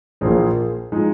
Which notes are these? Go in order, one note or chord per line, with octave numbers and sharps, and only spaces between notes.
A#1 A#2 A#3 G#4 C5
F3 G#3 D#4